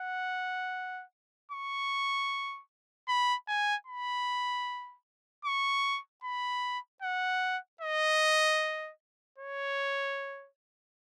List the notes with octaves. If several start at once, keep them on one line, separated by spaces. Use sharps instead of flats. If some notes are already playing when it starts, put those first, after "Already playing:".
Already playing: F#5
C#6
B5
G#5
B5
C#6
B5
F#5
D#5
C#5